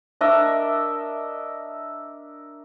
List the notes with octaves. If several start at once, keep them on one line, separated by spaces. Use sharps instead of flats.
D4 A#4 D#5 E5